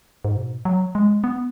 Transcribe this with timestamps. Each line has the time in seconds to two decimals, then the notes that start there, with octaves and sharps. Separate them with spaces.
0.25 G#2
0.37 B2
0.65 F#3
0.95 G#3
1.24 B3